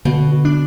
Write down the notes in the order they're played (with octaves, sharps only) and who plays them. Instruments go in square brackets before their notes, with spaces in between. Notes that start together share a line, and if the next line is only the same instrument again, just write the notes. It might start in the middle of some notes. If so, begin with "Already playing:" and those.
[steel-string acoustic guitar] B2 [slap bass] D3
[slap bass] D4